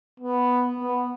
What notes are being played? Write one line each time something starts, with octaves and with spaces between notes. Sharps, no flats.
B3
B3